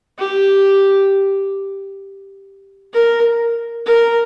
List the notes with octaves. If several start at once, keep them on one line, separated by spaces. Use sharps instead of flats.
G4
A#4
A#4